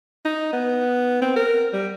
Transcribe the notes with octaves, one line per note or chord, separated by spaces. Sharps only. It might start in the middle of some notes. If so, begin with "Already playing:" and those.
D#4
B3
C4
A#4
G3